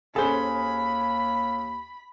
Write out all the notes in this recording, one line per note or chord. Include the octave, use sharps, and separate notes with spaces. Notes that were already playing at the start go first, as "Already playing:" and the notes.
D#2 C#4 G#4 A4 C5 B5